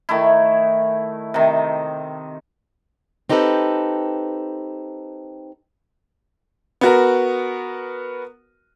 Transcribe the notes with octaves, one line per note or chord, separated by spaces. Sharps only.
D#3 A3 E4
C3 D#3
C4 D#4 G4 A4 B4
B3 F#4 A#4